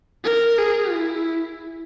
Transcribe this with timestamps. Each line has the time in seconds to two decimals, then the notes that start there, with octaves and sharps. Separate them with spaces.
0.24 A#4
0.59 G#4
0.93 E4